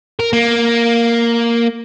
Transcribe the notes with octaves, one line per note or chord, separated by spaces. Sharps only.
A#4
A#3